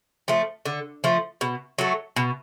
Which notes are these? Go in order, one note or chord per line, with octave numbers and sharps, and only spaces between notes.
F3 A3
D3
F3 A3
B2
F#3 A3
B2